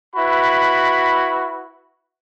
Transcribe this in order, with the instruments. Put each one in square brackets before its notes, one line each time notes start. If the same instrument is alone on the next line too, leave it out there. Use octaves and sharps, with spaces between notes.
[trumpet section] E4 F#4 B4 B5